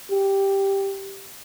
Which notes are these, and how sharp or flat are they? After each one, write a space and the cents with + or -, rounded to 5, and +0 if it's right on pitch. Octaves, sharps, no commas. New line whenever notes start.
G4 +0